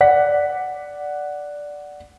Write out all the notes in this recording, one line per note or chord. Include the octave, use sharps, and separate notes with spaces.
D5 F#5 B6